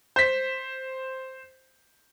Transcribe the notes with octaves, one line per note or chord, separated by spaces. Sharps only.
C5 B6